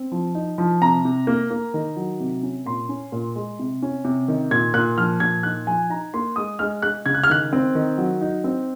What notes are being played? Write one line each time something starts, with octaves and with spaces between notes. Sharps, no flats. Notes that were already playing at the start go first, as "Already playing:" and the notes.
Already playing: C4
F3
D#4
F3
C3 A#5
C3
A#3
A#3
D#3
F#3
C3
C#4
A#2 C6
C#4
A#2
G#3
C3
C#4
C3
D#3
A#2 G#6
A#2 F#6
F3 F6
A#2 G#6
D#4 F#6
F3 G#5
D#4 A#5
A#3 C6
G#3 D#6
G#3 F6
G#3 F#6
C#3 G#6
F#6
F6
D#3 F#6
C4
D#3
F#3
D#4
C4